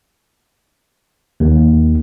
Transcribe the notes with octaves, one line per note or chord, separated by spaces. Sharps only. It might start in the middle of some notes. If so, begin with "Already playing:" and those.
D#2